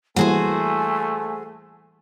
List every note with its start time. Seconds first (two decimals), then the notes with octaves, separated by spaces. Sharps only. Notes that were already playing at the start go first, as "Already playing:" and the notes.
0.16 E3 G3 A3 A#3 F#4 G#4 C5 G#5